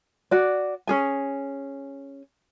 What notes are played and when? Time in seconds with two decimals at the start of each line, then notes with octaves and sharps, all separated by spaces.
0.31 F#4 D5
0.87 C#4 G#4 G#5